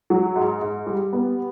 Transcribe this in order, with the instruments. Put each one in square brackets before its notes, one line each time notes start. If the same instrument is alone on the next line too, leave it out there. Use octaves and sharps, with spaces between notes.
[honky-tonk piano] F#3
G#2
G#2
G3
B3